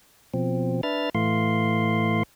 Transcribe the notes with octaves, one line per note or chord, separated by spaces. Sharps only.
B2 F3 C4
D4 B4 E5 F6 A6
A2 E3 A3 F5 C6